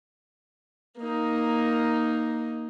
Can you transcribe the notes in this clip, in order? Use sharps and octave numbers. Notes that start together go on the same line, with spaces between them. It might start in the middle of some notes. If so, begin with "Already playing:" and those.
A#3 D#4